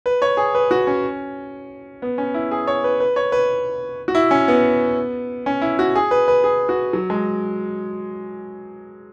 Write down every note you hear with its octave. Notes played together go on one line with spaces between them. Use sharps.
B4
C#5
G#4
B4
F#4
C#4
B3
C#4
E4
G#4
C#5
B4
B4
C#5
B4
F#4
E4
C#4
B3
C#4
E4
F#4
G#4
B4
B4
G#4
F#4
F#3
G#3